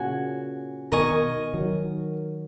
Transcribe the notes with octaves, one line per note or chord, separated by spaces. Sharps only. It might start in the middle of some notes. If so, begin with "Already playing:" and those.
Already playing: A#2 C#3 F#4 G#5
B2 D#3 A#4 D#5 G#5 C#6
D#3 F#3